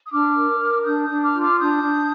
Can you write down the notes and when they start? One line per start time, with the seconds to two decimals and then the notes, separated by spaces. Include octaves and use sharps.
0.06 D#6
0.12 D4 D6 F6
0.35 A#4
0.60 A#4
0.81 F6
0.85 D4 D#6 G6
1.03 D#6 G6
1.09 D4
1.22 D6 F6
1.34 F4
1.40 D6 F6
1.59 D4 D#6 G6
1.83 D4